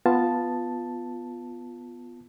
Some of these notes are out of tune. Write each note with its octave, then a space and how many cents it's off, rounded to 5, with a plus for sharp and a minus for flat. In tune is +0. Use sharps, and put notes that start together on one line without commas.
B3 +5 F4 +0 A5 +0